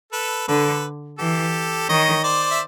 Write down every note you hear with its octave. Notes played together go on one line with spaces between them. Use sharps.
A4 B4
D3 A4 B4
E3 G4 A4
D#3 C#5 D#5
C5 D5
E5